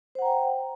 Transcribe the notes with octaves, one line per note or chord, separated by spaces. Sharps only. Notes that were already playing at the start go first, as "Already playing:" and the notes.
C5 F#5 G5 A#5